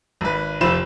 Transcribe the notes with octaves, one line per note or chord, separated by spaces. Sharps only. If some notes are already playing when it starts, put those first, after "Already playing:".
G#1 B4
F1 F4 C5 B5 E7